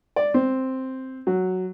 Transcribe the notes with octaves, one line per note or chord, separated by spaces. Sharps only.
D5
C4
F#3